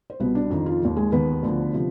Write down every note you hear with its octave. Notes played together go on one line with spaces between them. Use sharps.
C5
C2 B2 B3 B4
D4
F2 D#3 D#4
F3 F4
D#2 D#3
G#3 G#4
D#2 D#3 B3 B4
D2 D3 F3
C3 F3